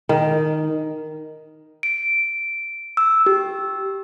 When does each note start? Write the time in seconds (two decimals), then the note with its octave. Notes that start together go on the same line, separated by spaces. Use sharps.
0.09 D#3
1.83 D7
2.97 E6
3.26 G4